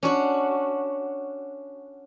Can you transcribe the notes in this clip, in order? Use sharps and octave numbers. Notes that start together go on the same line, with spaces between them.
C#4 D4 F#4